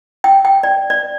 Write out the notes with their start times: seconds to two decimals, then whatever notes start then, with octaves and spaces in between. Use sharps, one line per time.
0.24 G5
0.45 G5
0.63 D5
0.90 D5